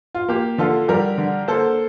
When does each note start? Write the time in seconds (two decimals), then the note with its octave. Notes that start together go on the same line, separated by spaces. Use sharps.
0.15 F4
0.28 A#3 G4
0.58 D3 F4 A4
0.88 G3 G4 A#4
1.18 D3
1.48 A#3 A4 C5